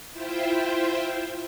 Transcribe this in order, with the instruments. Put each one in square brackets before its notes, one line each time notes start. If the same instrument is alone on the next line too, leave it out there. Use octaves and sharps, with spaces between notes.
[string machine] E4 F4 C5 E5 G5